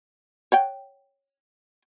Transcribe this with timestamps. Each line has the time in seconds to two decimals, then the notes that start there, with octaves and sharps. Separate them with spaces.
0.52 C#5 F#5 G5